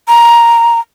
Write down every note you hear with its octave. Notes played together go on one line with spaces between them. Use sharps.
A#5